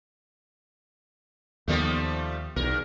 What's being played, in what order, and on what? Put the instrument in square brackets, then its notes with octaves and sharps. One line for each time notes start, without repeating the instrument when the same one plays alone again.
[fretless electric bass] D#2 D#3 B3 [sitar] F3 G3 A3
[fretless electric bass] B1 [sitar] E2 A#4